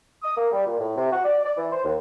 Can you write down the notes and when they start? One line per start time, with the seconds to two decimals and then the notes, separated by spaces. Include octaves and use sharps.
0.22 D#6
0.36 A#3
0.52 G3
0.66 A#2
0.79 A2
0.96 C3
1.11 F#4
1.24 D5
1.45 D5
1.57 E3
1.71 C5
1.84 D#2